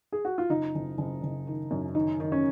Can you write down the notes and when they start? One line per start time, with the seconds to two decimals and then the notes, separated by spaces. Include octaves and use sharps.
0.12 G#4
0.25 F#4
0.38 F4
0.50 F#1 D#4
0.75 F#1
0.98 F#1
1.23 F#1
1.47 D#3
1.71 F#2
1.95 D#3 D#4
2.20 D#3
2.32 C#4